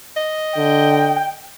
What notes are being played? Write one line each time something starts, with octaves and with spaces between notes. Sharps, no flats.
D#5
D3 G5